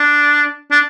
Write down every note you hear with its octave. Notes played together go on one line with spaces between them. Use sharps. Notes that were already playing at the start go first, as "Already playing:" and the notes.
Already playing: D4
D4